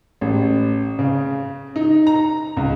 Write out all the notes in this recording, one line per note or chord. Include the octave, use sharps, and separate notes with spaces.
A1
C#3
D#4
A#5
C#2